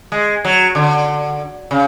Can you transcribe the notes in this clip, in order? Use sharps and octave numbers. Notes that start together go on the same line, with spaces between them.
G#3
F#3
D3
C#3